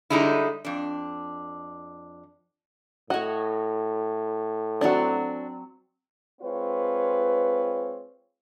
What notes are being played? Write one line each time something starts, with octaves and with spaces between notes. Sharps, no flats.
D3 G3 G#3 D#4 E4
F2 D4
A2 F#4 C#5 D#5
F#3 C4 D4 F#4 A5
G#3 C4 F4 B4 C#5